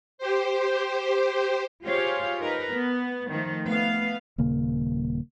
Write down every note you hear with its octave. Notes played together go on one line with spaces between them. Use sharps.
G4 C5
F4 G4 G#4 C5 C#5 F5
D#4 A#4 B4
B3
D#3 F3 A3
A3 B3 F5
D#1 C#3 A#3